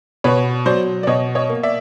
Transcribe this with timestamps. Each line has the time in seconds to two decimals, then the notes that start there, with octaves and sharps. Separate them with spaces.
0.24 B2 B4 C#5
0.66 F#3 C5 D5
1.03 D5
1.07 B2 C#5 D#5
1.35 C#5 D#5
1.49 A#3
1.63 D5 E5